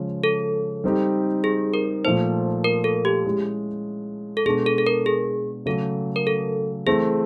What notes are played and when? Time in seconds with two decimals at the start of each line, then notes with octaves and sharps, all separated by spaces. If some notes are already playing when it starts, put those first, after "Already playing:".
Already playing: C#3 F3 G#3 C#4
0.24 A4
0.84 G3 C4 D#4 G4
1.44 G#4
1.74 A#4
2.04 A#2 F3 A3 C5
2.64 A#4
2.84 A4
3.05 G4
3.25 G#3 C#4 E4 G#4
4.37 A4
4.45 B2 G#3 B3 D4 G#4
4.66 A4
4.78 A4
4.87 A#4
5.06 G#4
5.66 C#3 F#3 A3 A4
6.16 A#4
6.27 A4
6.87 E3 A3 C4 G#4